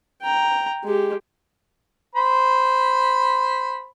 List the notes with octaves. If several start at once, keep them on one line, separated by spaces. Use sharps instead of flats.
G5 A#5
G#3 G4
C5 B5